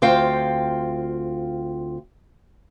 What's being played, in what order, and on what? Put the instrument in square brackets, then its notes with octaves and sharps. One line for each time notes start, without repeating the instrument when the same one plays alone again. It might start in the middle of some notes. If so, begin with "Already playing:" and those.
[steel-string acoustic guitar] D2 C4 F4 F5 G5